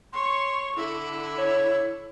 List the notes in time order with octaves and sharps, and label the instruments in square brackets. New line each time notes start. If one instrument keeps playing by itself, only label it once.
[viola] C#5 C#6 [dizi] C6
[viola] D3 [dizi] E4
[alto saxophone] C#5